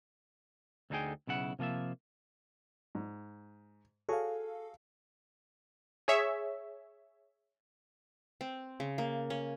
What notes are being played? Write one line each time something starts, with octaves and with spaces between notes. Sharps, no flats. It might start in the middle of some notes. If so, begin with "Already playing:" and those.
D2 D3 D#4 E4 G#4 G5
B1 C#3 E4 F#5
C3 F3 A#3 F4 E5
G#2
F#4 G#4 A4 C#5 F5
G#4 C#5 E5
C4
C#3
A#3
C#4